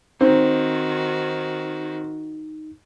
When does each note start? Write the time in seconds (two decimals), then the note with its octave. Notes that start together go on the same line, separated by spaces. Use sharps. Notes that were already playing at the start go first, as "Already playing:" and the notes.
0.21 D#3 C4 D#4 F#4